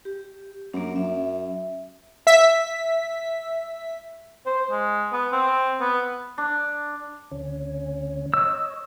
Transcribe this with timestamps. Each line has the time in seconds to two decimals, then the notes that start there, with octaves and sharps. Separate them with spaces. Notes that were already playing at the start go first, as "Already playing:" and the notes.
0.05 G4
0.74 F#2 A#3 D4
0.96 F#2 E5
2.27 E5 B6
4.46 C5
4.71 G#3
5.13 B3
5.32 C4
5.81 B3
6.38 D4
7.31 D2 C#4
8.34 C#5 D#5 E6